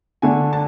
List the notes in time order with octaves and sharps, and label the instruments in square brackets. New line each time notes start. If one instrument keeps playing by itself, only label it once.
[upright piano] D3 A3 D4 G#5
A5